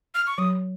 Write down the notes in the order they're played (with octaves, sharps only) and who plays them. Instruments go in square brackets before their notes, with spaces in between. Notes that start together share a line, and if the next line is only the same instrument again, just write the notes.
[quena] F6
C#6
[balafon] F#3 [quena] D#6